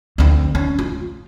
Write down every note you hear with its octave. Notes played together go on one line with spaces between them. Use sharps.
D2 C4
C#4
F4